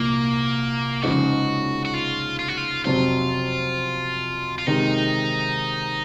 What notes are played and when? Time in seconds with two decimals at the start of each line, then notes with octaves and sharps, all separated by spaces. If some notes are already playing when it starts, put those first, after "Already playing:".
Already playing: C2 A#2 F3 A#3
1.03 C#3 F3 G#3 D#4 F#4
1.85 F#4
1.94 F4
2.39 F4
2.48 F#4
2.57 F4
2.85 F2 C3 F#3 C4 F4
4.59 F4
4.67 C3 D#3 G#3 D#4